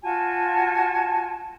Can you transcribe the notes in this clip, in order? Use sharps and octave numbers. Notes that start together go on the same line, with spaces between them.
F4 F#4 G#5 A5